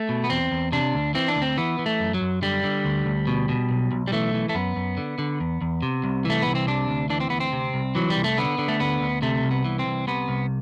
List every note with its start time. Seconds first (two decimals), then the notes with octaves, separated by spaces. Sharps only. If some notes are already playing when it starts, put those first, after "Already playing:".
Already playing: A3
0.09 B2
0.24 B3
0.30 E2 C4
0.51 E2
0.72 C3 D4
0.94 D2
1.15 E3 C4
1.28 D4
1.36 D2
1.42 C4
1.57 E3 B3
1.79 E3
1.86 A3
2.00 F#2
2.14 F#3
2.21 F#2
2.42 D3 G3
2.64 D3
2.85 D2
3.06 D2
3.27 B2
3.49 B2
3.70 B1
3.92 B1
4.08 G3
4.12 E3 A3
4.34 E3
4.49 A3
4.55 F#2 B3
4.76 F#2
4.97 D3
5.18 D3
5.40 E2
5.61 E2
5.82 C3
6.04 C2
6.25 E3 A3
6.42 C2 B3
6.55 C4
6.67 C3 D4
6.89 D2
7.10 E3 D4
7.20 C4
7.30 D2 B3
7.40 C4
7.53 C3
7.74 C2
7.95 E3 F#3
8.10 G3
8.17 C2
8.24 A3
8.38 D3 B3
8.58 D3
8.68 A3
8.80 D2 B3
9.01 D2
9.22 C3 A3
9.44 C2
9.51 B3
9.65 E3
9.79 C4
9.86 C2
10.07 C3 B3
10.29 C2